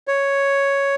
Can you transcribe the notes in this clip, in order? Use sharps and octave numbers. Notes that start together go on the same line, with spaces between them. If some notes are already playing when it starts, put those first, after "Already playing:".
C#5